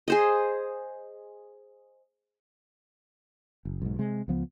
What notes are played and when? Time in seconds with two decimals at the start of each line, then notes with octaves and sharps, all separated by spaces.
0.08 G#4 C5 D#5
3.65 F#1
3.82 B1 G#2
3.99 C3 G#3
4.28 C#2 F3 B3